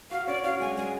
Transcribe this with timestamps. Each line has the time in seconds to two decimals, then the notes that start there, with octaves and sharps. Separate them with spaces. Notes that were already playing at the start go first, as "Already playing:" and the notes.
0.11 F#4 F5
0.27 C#4 D5
0.44 F#4 F5
0.60 G#3 G#5
0.77 G#3 G#5